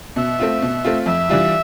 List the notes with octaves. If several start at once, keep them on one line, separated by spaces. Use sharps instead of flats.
B2 E5
A3 C4 F4
B2
A3 C4 F4
F2 E5
E3 G3 D4 F4